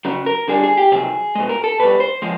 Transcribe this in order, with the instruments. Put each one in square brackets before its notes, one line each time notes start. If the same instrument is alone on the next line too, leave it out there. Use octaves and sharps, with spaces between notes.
[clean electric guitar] C#3 F#3
A#4
D3 G3 G#4
G#4
G4
C3 D#3 F#3 G#4
B2 G#3
A#4
A4
B2 G3 B4
C5
F3 G#3